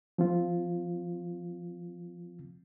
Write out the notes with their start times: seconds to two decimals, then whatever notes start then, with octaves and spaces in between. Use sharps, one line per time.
0.18 F3 C4 F4